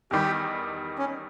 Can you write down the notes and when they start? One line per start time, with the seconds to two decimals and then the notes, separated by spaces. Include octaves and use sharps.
0.11 E2 D#3 G3 G4
0.99 C#4